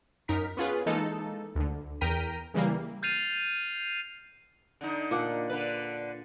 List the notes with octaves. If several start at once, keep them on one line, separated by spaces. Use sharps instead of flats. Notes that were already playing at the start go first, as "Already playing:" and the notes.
F#2 D#4 A#4 B6
B3 C#4 F4 G#4 B4
E3 G#3 A#3 D#4 A4
D2 D3
E2 A#4 G5 A#5 B6 D#7
C#3 E3 G3 A#3
F6 G6 A6 C7 D#7 F7
D3 D#4
A#2 D4 F#5
D3 B4